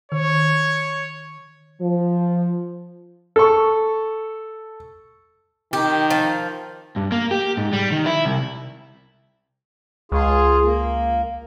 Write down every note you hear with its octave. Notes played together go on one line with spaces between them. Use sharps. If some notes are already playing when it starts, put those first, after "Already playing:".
D#3 C#5
F3
A4 C#6
D#3 G4
F3
G2
A#3
G4
G#2
G3
D#3
E4
C2
C#2 F4 G#4
A#3